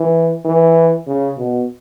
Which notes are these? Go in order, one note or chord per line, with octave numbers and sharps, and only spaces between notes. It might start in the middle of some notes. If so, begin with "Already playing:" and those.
Already playing: E3
E3
C#3
B2